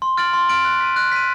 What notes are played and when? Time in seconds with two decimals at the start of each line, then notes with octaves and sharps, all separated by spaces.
0.02 C6
0.17 F6 A6 D7 F#7
0.33 C6
0.49 F6 A6 D7 F#7
0.65 F#6
0.80 B6 D#7
0.96 F#6
1.12 B6 D#7